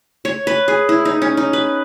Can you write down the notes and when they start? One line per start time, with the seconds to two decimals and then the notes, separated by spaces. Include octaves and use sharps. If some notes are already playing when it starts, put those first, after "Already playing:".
0.25 C#5
0.47 B4
0.68 G#4
0.89 E4
1.05 D#4
1.22 C#4
1.37 D#4
1.53 B4